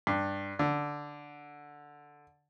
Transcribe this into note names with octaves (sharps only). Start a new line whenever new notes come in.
G2
D3